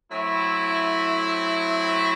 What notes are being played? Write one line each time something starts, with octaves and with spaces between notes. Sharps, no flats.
F#3 A3 C4 E4